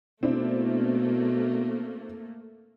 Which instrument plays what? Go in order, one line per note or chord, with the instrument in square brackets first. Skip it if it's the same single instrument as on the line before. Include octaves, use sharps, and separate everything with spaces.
[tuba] B2 [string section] A3 A#3 [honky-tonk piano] C4 D4 E4